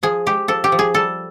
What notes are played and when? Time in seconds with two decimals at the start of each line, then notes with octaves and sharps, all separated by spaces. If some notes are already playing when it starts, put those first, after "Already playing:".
0.03 F3 G#4
0.26 G#3 G4
0.48 F3 A4
0.64 G4
0.72 F3
0.79 G#4
0.94 G3 A4